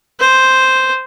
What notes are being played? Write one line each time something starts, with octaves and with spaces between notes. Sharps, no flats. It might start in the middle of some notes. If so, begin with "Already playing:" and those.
C5